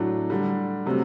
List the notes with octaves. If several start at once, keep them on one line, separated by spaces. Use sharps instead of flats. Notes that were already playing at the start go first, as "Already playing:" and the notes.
Already playing: A2 F#3 A3 D4
D3 G3
C3 F#3 A3